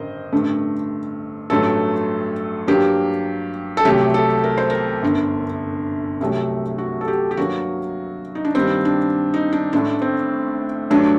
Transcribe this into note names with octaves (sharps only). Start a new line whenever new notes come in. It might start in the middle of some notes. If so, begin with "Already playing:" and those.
Already playing: A1 G2 D3 A#4 C5 D#5
A1 G2 D3 A3
A1 G2 F#3 A3 A4
G2 F#3 A#3 G4
A4
C2 C3 F#3 A3 G4
A4
A#4
C5
A#4
G1 F#2 D3
C2 C3 F#3 A3
F#4
A4
G4
G4
G2 F#3 A#3 F#4
D#4
D4
G2 D#3 G3 A#3 C4
D4
D#4
D4
A1 A2 A3 D4
C4
G2 F#3 A3 D4